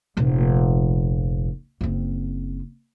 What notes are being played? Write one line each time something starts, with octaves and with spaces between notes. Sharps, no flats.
F1 A#1
F#1 C4